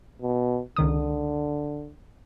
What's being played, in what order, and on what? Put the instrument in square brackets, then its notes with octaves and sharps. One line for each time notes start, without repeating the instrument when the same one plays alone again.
[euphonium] B2
[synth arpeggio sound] C#2 D#3 D#6 [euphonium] D3